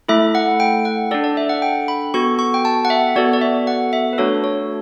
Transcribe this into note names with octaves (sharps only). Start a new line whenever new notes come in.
A3 E4 A4 E5
F#5
G5
F#5
D4 A4 D5
D5
E5
F#5
G5
B5
B3 F#4 A4 C#6
C#6
G5
A5
F#5
E5
B3 F#4 A4 D5
D5
E5
F#5
E5
B4
A3 D4 F#4 A4 C#5
C#5